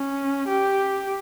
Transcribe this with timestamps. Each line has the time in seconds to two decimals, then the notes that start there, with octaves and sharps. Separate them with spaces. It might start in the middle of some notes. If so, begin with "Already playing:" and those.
Already playing: C#4
0.48 G4